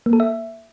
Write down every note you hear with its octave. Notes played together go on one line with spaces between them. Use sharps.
A#3
A4
E5